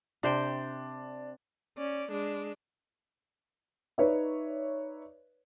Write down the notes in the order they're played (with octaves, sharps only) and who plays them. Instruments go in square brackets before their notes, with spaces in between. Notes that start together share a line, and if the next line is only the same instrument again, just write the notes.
[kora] C3 C5 G5 [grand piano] D4
[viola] C#4 D5
G#3 D4
[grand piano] D#4 B4 C#5 D5 E5